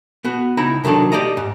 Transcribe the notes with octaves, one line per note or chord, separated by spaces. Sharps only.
B3 F#4
C#2 D#4 E4 A#5
C3 D#3 F#3 D4 A4
G4 D5 D#5 A#5
G#2